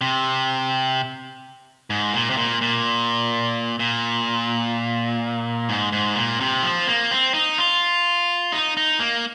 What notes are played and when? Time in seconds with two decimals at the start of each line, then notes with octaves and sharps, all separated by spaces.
0.01 C3
1.90 G#2
2.13 A#2
2.30 C3
2.37 A#2
2.61 A#2
3.79 A#2
5.69 G#2
5.92 G#2
6.16 A#2
6.40 C3
6.63 F3
6.88 A#3
7.11 C4
7.34 D#4
7.58 F4
8.52 D#4
8.77 D#4
9.00 A#3